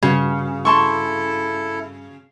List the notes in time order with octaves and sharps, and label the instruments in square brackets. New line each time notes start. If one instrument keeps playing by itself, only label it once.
[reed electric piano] G2 F#4 [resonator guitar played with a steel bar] C#3
[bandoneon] E4 A4 [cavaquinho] A5 C6 C#6